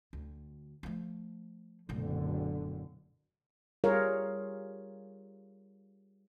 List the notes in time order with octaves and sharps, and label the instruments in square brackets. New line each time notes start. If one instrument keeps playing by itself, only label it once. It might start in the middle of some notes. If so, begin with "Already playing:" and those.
[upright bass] D2
F3 A3
[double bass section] F#1 B1 D3 [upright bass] A#2 A3
[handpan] G3 F4 G#4 A#4 C#5 F5